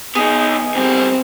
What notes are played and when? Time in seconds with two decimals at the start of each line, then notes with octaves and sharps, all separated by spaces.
0.15 B3 D#4 G#4
0.74 D2 G3 C4